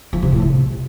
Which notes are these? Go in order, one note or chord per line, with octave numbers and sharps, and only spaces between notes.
F3
C3
A2
C3